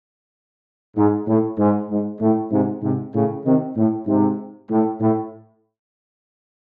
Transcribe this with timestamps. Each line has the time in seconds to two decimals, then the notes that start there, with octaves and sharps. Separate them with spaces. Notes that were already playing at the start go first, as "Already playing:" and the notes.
0.96 G#2
1.27 A2
1.58 G#2
1.90 G#2
2.21 A2
2.51 G#2 C3
2.82 G#2 C3
3.14 A2 C#3
3.45 C3 D#3
3.76 A2
4.07 G#2 C3
4.70 A2
5.00 A2